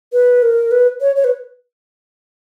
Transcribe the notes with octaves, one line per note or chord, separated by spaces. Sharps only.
B4
A#4
B4
C#5
C#5
B4